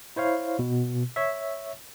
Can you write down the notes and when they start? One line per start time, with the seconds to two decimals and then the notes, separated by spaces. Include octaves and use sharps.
0.16 E4 C5 C#5 F5
0.59 B2
1.16 C#5 E5